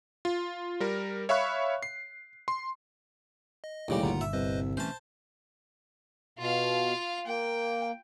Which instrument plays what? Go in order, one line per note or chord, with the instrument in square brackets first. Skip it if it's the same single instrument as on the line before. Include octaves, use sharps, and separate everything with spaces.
[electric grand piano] F4
G3 A#4
C#5 E5 F5 B5 C#6 F#6
C7
C6
[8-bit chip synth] D#5
[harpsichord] A1 C#3 G3 [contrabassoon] D#2
[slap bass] G1 A#2 D3 [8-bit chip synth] F4 F#5 A#5
[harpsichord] E5
[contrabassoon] C2 [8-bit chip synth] B4 C5 D#5
[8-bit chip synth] E3 A3 C#4 [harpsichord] C5 A5
[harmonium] B2 [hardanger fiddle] F4 F5
[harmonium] A#3 [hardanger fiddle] G5